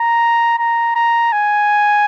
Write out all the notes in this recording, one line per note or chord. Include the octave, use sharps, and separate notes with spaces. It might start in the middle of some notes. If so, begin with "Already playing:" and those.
Already playing: A#5
A#5
A#5
G#5